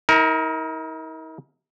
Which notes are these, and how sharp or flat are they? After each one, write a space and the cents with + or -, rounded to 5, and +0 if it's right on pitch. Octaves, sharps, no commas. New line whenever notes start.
D#4 +45 A#4 +0